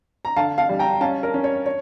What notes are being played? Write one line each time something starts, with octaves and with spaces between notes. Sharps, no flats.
A#5
D3 F5 A5
F5 A5
G3
G5 A#5
C#4 F5 A5
A#4
C#4
C#5
C#5